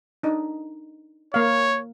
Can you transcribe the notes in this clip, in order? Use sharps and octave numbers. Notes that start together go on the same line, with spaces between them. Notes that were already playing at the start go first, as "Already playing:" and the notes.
D4 D#4
A#3 C#5 F5